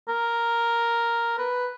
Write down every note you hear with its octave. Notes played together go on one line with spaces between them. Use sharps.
A#4
B4